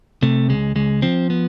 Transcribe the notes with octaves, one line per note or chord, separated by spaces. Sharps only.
C3 A3
C#2 G#3
C#2 G#3
F3 C4
B3